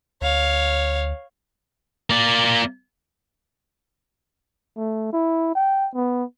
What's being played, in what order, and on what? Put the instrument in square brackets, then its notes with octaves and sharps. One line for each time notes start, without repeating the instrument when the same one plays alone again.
[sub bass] D2 [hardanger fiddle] C#5 F5
[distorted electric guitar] A#3 D5
[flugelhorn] A3
E4
G5
B3